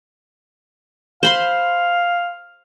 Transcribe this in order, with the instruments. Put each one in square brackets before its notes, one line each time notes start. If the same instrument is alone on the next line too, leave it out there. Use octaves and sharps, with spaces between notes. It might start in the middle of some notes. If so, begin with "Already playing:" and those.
[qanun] C5 B5 C6 [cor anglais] F5